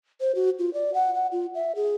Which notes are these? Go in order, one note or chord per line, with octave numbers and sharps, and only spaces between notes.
C5
F#4
F4
D5
F#5
F#5
F4
E5
G#4